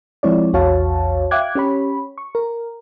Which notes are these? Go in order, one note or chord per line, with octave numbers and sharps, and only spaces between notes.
F3 G#3 C4 E4 C#5 D5
A#1 E2 F#4 C#5 F5 A5
E5 F5 G5 D6 F#6 G#6
C#4 G4 C#5 B5
C#6
A#4